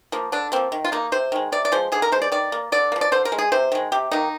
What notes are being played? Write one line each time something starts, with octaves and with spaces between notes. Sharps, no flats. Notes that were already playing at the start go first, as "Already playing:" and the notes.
F3 A#3
D3 D4
F3 A#3 C4
D#3
F4
A#3 D#4
C3 C5
D#3 G#3
C3 D5
D5
F3 G#3 C5
D3 G#4
A#4
G#3 C5
D5
D#3 D5
A#3
D3 D5
A#3
F3
D5
D3 C5
A#4
G#3
G#4
C3 C5
D#3 G#3
C3 G4
D#3 A#3 D#4